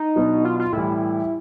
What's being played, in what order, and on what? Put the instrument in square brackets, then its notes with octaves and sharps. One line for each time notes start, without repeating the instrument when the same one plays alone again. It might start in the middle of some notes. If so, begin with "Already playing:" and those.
Already playing: [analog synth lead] D#4
[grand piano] B2 F#3 B3 D4 F#4
[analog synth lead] F4
F4
[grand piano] A2 E3 G3 [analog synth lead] E4